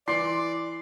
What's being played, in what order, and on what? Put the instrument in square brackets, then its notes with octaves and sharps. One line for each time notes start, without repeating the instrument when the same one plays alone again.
[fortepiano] E3 D6 [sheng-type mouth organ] D5 [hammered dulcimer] C6